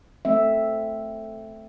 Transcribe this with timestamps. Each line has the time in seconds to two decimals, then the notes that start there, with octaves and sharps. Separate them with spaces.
0.25 A3 C4 E5